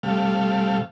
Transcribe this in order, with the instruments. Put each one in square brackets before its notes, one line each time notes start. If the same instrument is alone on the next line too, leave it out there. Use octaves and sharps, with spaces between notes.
[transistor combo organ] C3 G3 A3 F5